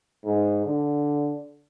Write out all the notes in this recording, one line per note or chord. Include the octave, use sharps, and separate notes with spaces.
G#2
D3